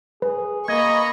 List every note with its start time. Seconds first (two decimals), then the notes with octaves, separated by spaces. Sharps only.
0.22 G#4 B4
0.68 A#3 D#5 A#5 B5 C#6 G#6